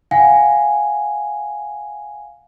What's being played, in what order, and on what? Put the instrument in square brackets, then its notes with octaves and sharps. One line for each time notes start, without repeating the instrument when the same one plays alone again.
[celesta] F5 F#5 G#5